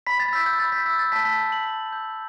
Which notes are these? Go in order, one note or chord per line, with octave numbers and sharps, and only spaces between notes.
B5 B6
A6
E6 G6 B6
G6
B5 A6
B6
E6 G6 B6
A6
A5 B6
B6
E6 G6
F#7
A5 B6
E6 G6